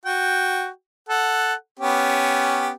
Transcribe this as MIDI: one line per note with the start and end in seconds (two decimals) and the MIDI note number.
0.05 0.68 66
0.05 0.68 79
1.09 1.54 69
1.09 1.54 78
1.79 2.71 59
1.79 2.71 61
1.79 2.71 67